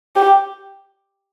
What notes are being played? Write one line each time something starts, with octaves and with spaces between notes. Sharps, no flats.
G4